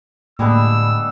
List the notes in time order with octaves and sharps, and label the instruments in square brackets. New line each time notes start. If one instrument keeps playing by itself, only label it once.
[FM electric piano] A2 [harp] D3 G#3 A#3 [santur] G3 B3 [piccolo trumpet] E6